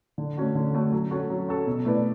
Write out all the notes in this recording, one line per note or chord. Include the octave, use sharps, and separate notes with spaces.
D3
A3 C#4 F#4
D3
A3 C#4 F#4
F#3
C#4 F#4 A4
F#3
C#4 F#4 A4
B2
A3 E4 B4 D5